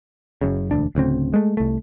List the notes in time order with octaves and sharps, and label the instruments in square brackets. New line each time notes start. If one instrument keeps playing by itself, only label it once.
[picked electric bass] F#1 F#2 C#3
E1 D2 D4
D1 D2 C#3 C4
G#3 A3
C2 A3